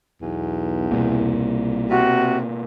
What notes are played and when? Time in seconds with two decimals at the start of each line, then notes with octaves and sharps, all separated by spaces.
0.22 B1 E2
0.92 C2 B2 A#3
1.90 C3 F#4